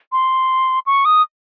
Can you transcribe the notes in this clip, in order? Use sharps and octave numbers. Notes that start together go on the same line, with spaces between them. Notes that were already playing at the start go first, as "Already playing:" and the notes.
C6
C#6
D#6